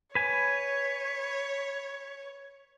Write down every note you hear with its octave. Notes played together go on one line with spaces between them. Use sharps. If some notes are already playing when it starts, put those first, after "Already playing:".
B4 C#5 G#5